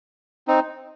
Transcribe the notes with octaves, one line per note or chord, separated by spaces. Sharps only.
C4 D#4